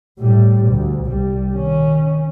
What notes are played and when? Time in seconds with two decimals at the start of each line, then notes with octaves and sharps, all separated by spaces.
0.19 A2 G3
0.68 D2
1.05 C2 G3
1.52 D#3 C#4